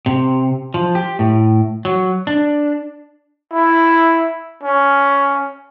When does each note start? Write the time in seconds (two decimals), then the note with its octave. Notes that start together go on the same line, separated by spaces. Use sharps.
0.06 C3
0.74 F3
0.95 G4
1.19 A2
1.85 F#3
2.27 D4
3.53 E4
4.63 C#4